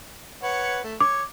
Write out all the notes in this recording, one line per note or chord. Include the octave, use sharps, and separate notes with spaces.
B4 C#5 F#5
A3
C#5 D6